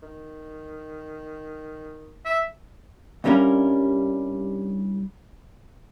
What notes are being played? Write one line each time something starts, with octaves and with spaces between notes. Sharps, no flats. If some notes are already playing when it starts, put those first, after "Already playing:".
D#3
E5
C2 G2 G3 C#4 A#4